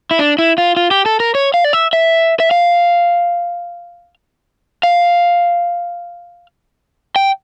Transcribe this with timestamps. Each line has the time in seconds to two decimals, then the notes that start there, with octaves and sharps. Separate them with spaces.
0.11 E4
0.19 D4
0.39 E4
0.58 F4
0.77 F4
0.91 G4
1.06 A4
1.20 A#4
1.35 C#5
1.54 F5
1.64 D5
1.73 E5
1.93 E5
2.40 E5
2.51 F5
4.83 F5
7.16 G5